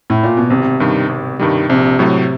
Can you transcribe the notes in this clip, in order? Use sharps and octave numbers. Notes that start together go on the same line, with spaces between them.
A2
A#2
B2
G#1 C3
G2 D#3 G3
G#1
G2 D#3 G3
A#1 C3
A2 F#3 A3